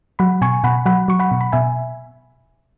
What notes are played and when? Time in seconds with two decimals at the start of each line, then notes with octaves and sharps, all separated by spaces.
0.19 F#3 F#5 B5
0.41 B2 G#5 C#6
0.64 B2 F#5 B5
0.86 F#3 F#5 B5
1.08 F#3 C#6
1.20 F#5 B5
1.31 B2
1.41 B5
1.52 B2 E5 G#5